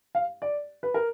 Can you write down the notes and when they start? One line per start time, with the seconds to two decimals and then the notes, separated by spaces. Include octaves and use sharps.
0.15 F5
0.42 D5
0.83 B4
0.94 A#4